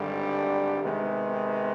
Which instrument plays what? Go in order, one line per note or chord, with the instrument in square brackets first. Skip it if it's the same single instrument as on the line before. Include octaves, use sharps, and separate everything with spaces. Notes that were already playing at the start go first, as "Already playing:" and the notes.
Already playing: [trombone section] G#1 G2 D3 G3
C3 D#3 G#3 B3